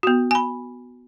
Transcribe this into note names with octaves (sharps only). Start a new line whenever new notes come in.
B3 F#4
G#5 B5